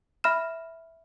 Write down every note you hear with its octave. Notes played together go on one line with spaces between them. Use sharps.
E5 B5 F6 E7